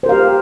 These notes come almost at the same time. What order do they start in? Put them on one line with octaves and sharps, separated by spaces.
C5 A#4 F5 G4